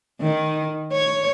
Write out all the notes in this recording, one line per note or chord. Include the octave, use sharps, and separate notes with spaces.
D#3
C#5